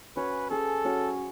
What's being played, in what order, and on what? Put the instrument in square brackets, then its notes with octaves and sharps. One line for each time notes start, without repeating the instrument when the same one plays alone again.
[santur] C#4 F#4 C#5 [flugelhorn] B4
[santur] C#4 G#4 B4 [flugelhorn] A4
[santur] F#3 C#4 F#4 C#5